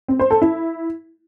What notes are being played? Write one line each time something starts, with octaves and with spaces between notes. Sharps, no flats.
C4
C5
A4
E4